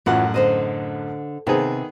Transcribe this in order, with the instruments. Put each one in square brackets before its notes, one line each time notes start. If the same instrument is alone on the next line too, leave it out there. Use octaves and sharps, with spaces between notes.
[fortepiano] A1 F#2 F#5 [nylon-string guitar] E3 F#3 F4
[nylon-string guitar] D3 C5 D#5
[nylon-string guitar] C3 [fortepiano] D#3 B3 G#4